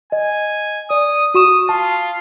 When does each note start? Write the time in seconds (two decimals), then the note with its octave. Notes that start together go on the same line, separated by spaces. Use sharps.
0.12 D#5 G#5
0.90 D5 D#6
1.34 F#4 C#6 D#6 E7
1.69 F4 A5